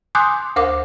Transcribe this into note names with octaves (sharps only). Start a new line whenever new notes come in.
G#5 C6 D6 D#6 F#6 G6
D2 A#4 C5 F5 D6